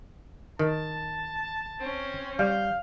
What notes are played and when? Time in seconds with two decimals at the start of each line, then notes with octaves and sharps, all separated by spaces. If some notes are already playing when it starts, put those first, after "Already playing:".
0.59 D#3 A5
1.80 C4 C#4
2.39 G3 F5 G6